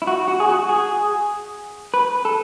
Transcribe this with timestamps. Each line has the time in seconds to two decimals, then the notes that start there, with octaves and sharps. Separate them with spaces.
0.02 E4
0.07 F#4
0.28 F#4
0.40 G#4
0.49 F#4
0.69 G#4
1.94 B4
2.25 A4